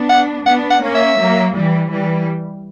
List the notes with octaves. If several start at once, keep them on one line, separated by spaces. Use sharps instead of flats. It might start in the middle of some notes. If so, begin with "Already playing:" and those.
Already playing: B3 D4
F#5
B3 D4 F#5
F#5
A#3 C#4
E5
F#3 A#3
E3 G3
E3 G3